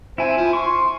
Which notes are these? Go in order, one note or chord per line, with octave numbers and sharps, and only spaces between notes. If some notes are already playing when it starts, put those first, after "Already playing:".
C4 E4 G#5
F3
C6 C#6